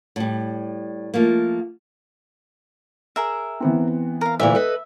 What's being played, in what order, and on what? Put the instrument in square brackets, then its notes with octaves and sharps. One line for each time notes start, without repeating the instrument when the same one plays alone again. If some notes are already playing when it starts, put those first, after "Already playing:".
[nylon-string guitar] A2 G3
F3 A3 A#3
[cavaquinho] G#4 A#4 E5
[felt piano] E3 B3 C4
[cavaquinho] A#4 F5
[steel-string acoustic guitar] D2 A#2 E3 [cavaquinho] E5
[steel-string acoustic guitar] A4 B4 D#5